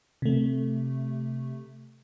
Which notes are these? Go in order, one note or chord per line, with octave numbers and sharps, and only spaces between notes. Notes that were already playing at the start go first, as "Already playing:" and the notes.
C3 A3